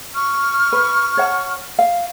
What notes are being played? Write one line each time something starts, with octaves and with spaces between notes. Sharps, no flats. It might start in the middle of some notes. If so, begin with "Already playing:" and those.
C#6 F6
B4
C#5 F#5 A5
F5